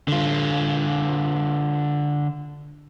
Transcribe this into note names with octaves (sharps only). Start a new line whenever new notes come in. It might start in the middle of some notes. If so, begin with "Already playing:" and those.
D3 F4